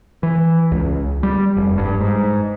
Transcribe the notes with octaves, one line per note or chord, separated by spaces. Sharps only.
E3
C#2
G3
F1
G2
G#2